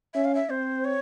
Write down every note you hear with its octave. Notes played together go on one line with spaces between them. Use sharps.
C#4 E5
F5
E5
C4 C5
C#5